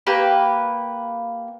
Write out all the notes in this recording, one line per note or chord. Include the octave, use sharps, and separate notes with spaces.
A#3 G4 B4